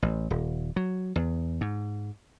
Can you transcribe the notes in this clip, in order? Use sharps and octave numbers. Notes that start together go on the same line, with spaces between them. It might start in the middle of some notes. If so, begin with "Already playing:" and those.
A1
D#1
F#3
E2
G#2